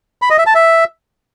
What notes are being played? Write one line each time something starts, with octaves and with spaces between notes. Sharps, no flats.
B5
D#5
E5
A5
E5